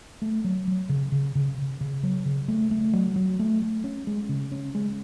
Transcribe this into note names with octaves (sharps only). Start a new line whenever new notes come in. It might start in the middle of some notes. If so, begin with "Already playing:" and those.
A3
F#3
F#3
C#3
C#3
C#3
C#3
C#3
F#3
C#3
A3
A3
F#3
F#3
A3
A3
C#4
G#3
C#3
C#4
G#3